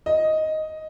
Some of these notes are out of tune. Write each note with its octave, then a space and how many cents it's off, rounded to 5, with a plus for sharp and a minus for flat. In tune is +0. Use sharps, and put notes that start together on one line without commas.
D#5 +5